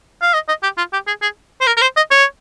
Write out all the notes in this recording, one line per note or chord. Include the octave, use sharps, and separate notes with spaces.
F5
D#5
D#5
G4
F4
G4
G#4
G#4
C5
A#4
A#4
C5
D#5
C#5